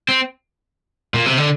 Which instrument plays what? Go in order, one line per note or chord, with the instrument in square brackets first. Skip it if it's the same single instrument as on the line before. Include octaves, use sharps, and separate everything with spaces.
[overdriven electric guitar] C4
A#2
C3
D3